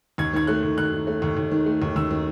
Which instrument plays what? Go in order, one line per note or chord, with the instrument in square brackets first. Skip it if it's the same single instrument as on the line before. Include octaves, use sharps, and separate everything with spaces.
[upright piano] D#2 G#6
D#3 G#6
A3 F#6
D#2
D#2 F#6
D#3
A3
D#2
D#2
D#3
A3
D#2
D#2 E6
D#3